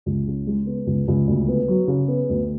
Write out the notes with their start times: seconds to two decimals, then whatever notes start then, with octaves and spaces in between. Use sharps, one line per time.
0.06 C#2
0.27 C#3
0.47 G#3
0.66 B3
0.87 C#2
1.08 C#2
1.28 D2
1.48 B3
1.68 F#3
1.88 C#3
2.08 B3
2.29 D2